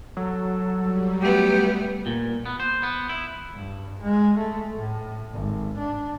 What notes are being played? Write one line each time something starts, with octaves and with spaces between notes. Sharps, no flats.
F#3 A4
G3
A3 B3 G4
A#2
B3
C5
B3
E4
G2
G#3
A3
A2
G#1
D4